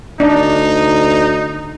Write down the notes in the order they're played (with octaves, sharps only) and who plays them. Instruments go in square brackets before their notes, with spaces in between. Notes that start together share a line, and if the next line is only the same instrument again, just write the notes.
[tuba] D2 [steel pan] D4 [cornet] D#4